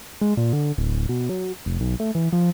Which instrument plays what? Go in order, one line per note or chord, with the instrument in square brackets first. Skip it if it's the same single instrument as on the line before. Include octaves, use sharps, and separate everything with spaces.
[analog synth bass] G#3
A#2
D3
D1
B2
F#3
F1
B1
A3
E3
F3